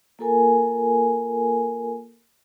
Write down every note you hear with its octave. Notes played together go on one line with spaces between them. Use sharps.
A#3 F4 A4 A#4 G#5